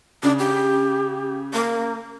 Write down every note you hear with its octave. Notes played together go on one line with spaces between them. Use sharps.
C#3 D4
G4
A#3